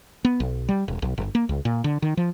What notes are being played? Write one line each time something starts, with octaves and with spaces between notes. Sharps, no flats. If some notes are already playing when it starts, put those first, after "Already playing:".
B3
B1
G3
E1
B1
G1
A#3
C#2
A#2
D3
D#3
F3